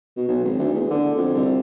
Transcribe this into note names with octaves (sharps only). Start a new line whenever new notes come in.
B2
B1
G#1
D2
E2
D3
F2
C2